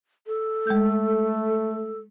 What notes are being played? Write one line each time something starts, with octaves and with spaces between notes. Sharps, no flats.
A4
G#3 A3 G6